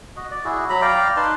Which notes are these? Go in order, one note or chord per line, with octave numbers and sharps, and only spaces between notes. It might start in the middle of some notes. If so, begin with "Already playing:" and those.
F#4 D#5
D5
E4 F#4 G#4
F#3 A#5 B5
D5 F5 G5 A#5
D#4 B4 A5 C6